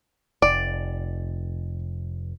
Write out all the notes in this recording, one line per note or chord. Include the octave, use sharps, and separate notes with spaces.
F1 D5